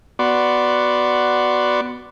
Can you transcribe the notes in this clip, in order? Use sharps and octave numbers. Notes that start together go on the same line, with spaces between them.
B3 F#4 D5 C6